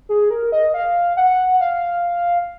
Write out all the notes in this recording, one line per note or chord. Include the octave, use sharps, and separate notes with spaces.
G#4
A#4
D#5
F5
F#5
F5